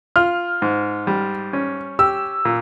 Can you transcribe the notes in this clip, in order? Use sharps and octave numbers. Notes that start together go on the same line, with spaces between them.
F4 F6
G#2
G3
C#4
G4 E6
A#2